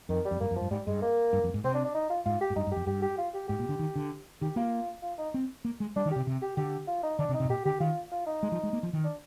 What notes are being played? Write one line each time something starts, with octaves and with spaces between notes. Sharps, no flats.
F2 D#3
G3
F2
G2 A#3
F2
F3
G2
G#2 G3
G2 G#3
A#3
G2
F2
G#2
C3 C4
D4
D4
D#4
F4
G#2 F4
G4
G#2
G2 D#4
G2
F2 G4
G2 G4
G4
F4
G4
G#2 G4
A#2
D3
D#3
D3
D#3 G4
A#3 F4
F4
D#4
C4
A#3
G#3
G3 D4
D#3
C3 G4
C3
G4
D3 G4
F4
D#4
D3 D4
C3
D#4
C3
G#2
A#2 G4
D3 G4
D#3 F4
F4
D#4
G#3
F3
G#3
A#3
F3
D#3
D4